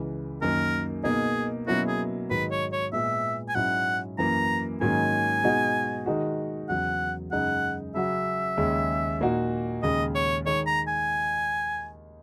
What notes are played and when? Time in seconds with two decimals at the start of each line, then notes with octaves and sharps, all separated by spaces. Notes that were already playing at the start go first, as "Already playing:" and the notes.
Already playing: C#2 C#3 E3
0.42 F#2 D#3 A#3 A#4
1.04 B2 A#3 D#4 G#4
1.67 B2 F#3 A#3 C#4 E4 F#4
1.87 G#4
2.30 G#2 D#3 F#3 B4
2.51 C#5
2.72 C#5
2.93 A#2 G#3 B3 E5
3.48 G#5
3.55 G#2 F#3 C#4 E4 F#5
4.18 F#2 E3 A#3 A#5
4.81 G#2 D#3 F#3 A#3 C#4 G#5
5.44 B2 G#3 D#4 F#4
6.06 D#3 G#3 D#4 F#4
6.69 E2 C#3 F#3 F#5
7.31 F#2 C#3 G#3 D#4 F#5
7.94 C#3 F#3 C#4 F#4 E5
8.58 D#2 C#3 G#3 C#4
9.20 A#2 A#3 D#4 F#4
9.82 D#2 C#3 G#3 D#5
10.15 C#5
10.46 D#3 G#3 D#4 C#5
10.66 A#5
10.88 G#5